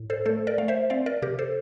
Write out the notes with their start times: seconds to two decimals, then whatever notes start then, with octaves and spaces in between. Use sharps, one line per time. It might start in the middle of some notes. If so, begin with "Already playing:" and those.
Already playing: A2
0.10 A4 C5
0.26 A3 A4 C5
0.47 A#4 D5
0.58 A3 F5
0.68 C5 E5
0.90 C4 D5 F5
1.06 A#4 D5
1.22 C3 G4 A#4
1.39 A4 C5